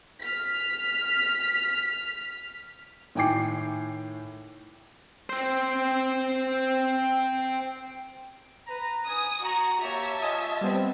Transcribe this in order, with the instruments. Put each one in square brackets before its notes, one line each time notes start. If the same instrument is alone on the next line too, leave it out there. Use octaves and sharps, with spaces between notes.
[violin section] F6 B6
[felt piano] A2 D#3 G5 G#5 D6 C7
[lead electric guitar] C4 C5
[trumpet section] B4 A#5
[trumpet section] G#5 [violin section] D#6
[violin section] F#4 [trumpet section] A#5
[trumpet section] A#3 G4 C#5 [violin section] E5 A5
[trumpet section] F4 [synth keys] D#5 G#5 D#6
[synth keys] G3 B3 C4